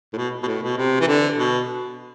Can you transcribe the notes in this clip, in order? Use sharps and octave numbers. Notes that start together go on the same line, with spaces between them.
A2
B2
B2
A2
B2
C3
E3
D3
B2